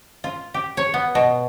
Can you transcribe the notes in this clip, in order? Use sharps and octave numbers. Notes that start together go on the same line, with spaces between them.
F4
G4
C#5
B3
B2